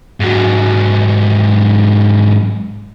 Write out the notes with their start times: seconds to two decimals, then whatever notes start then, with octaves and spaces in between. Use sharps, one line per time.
0.20 G#2 F#3